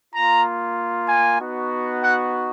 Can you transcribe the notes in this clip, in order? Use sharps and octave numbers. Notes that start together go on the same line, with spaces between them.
A#3 F4 A#5
G#5
B3 D#4 F#4
F#5